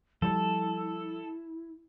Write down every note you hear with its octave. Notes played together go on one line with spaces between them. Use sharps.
F3 G3 E4 A4